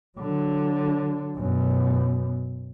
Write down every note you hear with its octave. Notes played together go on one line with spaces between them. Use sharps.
D3 F#3
F#2 B2